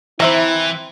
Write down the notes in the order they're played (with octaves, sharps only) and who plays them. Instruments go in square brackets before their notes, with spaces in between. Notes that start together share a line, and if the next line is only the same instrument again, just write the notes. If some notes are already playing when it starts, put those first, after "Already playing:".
[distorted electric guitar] E3 [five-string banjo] C4 E5 A#5 [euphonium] E4